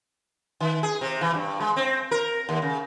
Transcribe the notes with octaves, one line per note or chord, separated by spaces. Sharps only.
D#3
G#4
C3
E3
G2
G#3
C4
A#4
D#2
C#3